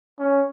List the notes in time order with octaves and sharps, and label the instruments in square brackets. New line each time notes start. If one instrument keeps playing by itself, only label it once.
[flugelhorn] C#4